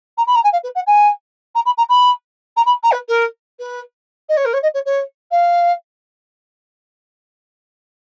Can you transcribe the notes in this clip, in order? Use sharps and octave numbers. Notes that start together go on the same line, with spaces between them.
A#5
B5
A#5
G#5
F5
B4
F#5
G#5
A#5
B5
A#5
B5
A#5
B5
A#5
B4
A#4
B4
D#5
C#5
A#4
C#5
D#5
C#5
C#5
F5